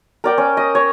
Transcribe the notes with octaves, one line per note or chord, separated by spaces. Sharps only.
A#4 D5 G5
C#4
D#5
C#5